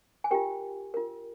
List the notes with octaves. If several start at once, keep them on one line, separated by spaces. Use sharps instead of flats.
G#5
F4 G4 A#4 G5
F4 A#4